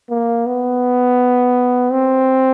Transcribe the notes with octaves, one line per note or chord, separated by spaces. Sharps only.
A#3
B3
C4